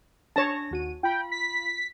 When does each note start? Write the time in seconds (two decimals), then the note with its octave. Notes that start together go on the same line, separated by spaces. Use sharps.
0.36 D4 C#5 A5 A#6
0.71 D#2 F#4 D#7
1.03 F4 G5 B5
1.31 B6